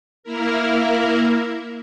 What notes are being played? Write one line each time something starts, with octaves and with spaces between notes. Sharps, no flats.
A#3 E4 A#4